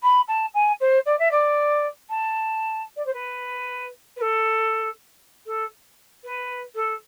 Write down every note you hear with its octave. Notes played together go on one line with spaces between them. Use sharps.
B5
A5
G#5
C5
D5
E5
D5
A5
D5
C5
B4
B4
A4
A4
B4
A4